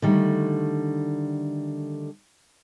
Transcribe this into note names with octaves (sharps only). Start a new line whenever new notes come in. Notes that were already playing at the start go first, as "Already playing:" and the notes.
D3 D#3 G3 A3